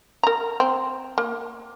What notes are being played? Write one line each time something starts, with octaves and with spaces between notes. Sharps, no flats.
A#4 A#5
C4
A#3